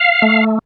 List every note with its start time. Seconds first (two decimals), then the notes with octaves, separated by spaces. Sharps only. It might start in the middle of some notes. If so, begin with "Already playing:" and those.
Already playing: F5
0.22 A3